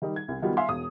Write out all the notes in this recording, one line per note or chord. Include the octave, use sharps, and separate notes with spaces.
D#3 G3 D#4
G#6
C2
D#3 F#3 G3 B3 F4
E5 F5 G#5 C6
E1 B2 D#6